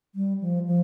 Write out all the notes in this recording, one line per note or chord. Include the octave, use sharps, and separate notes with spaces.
G3
F3
F3